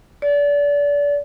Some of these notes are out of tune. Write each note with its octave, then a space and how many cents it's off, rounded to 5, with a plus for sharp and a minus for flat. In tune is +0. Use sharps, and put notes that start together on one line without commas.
D5 -30